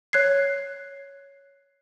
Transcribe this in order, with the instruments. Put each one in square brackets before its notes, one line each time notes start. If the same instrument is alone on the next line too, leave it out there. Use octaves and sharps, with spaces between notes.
[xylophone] C#5 F#6 G#6 C7